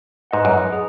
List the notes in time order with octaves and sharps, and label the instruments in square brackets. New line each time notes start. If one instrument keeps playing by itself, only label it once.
[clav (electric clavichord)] G#2 [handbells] B4 D#5 F#5
[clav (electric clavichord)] F#2
[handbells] G#4